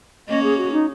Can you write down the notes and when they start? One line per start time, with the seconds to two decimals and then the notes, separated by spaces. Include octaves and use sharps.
0.28 A#3 C#4 D#5
0.43 G#4
0.58 F#4
0.72 D#4